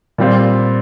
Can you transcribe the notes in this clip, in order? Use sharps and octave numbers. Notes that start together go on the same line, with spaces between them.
A#2 G3 C4 F4